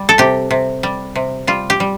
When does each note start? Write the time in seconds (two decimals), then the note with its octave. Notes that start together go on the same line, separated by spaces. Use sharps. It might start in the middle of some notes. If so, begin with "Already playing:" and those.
Already playing: G3
0.09 A4
0.18 C3 G4
0.51 C3
0.83 G3
1.15 C3
1.47 G3 F4
1.70 G4
1.80 G3